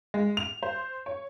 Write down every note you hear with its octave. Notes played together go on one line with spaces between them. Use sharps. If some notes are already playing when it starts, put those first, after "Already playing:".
G#3
F7
C5
C#5